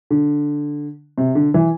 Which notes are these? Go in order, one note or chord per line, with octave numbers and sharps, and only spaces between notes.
D3
C3
D3
E3